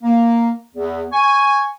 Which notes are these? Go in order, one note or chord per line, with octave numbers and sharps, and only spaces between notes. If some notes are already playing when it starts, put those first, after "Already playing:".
A#3
E2
G#5 C#6